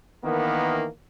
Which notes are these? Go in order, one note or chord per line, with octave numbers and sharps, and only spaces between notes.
D#3 E3 A#3 B3